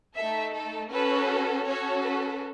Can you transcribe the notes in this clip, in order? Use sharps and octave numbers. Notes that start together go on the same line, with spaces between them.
A3 D#4 A4 E5
A4
C#4 F#4 A4 B4
C#4 F#4 A4 C#5
B4